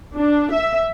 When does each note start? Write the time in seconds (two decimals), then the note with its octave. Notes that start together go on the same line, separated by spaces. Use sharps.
0.14 D4
0.53 E5